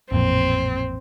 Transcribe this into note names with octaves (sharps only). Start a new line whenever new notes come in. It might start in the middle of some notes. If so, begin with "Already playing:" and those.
A1 F2 A#2 C4